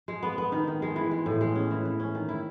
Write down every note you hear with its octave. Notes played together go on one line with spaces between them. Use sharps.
G#3
B3
B3
D#3
D#3
G#3
E3
G#3
A2
G#3
C#4
E3
E3
C#4
D#3
E4